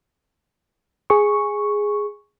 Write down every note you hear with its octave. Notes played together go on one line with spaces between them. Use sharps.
G#4 C#6